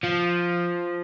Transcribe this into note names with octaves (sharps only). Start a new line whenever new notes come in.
F3